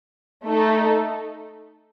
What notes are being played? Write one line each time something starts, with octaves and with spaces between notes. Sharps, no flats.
A3 D#4 A4